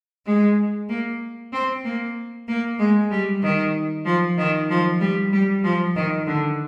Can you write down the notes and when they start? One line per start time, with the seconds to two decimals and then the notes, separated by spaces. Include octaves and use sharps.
0.26 G#3
0.89 A#3
1.53 C4
1.84 A#3
2.48 A#3
2.79 G#3
3.11 G3
3.43 D#3
4.05 F3
4.38 D#3
4.70 F3
5.01 G3
5.33 G3
5.64 F3
5.96 D#3
6.27 D3